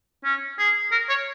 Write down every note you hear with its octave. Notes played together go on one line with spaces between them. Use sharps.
C#4
G#4
A#4
C#5